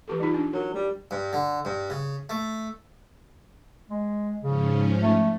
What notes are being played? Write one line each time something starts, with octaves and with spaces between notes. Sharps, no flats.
E3 G4 A4
G3 D#4 F4
D4
F#3 A#4
G3
G2
D3
G2
C#3
A3
G#3
G#2 C#3 F3 C#4
A3